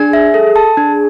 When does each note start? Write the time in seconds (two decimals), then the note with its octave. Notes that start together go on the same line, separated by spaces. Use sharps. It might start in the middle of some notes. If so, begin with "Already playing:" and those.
Already playing: D4 G#4
0.13 E5
0.34 A4
0.56 A5
0.77 D4